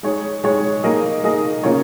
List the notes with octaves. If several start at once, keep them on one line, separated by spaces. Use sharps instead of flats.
G#3 D#4 G#4 C#5
G#3 D#4 G#4 C#5
A#3 D#4 G#4 D#5
A#3 D#4 G#4 D#5
C#3 A#3 F4 C#5